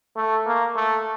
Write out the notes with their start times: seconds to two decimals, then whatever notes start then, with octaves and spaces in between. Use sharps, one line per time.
0.16 A3
0.46 A#3
0.76 A3